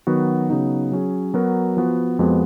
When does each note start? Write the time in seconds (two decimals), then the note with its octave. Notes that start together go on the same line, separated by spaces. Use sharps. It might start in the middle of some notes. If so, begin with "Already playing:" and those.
0.07 D#3 F#3 B3 F#4
0.50 C#3 F#3 B3 D#4
0.92 F#3 C#4 G#4
1.34 F#3 B3 F#4 A#4
1.77 F3 B3 F#4
2.19 F2 F3 G#3 B3 F#4